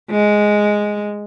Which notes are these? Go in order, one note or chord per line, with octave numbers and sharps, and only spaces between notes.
G#3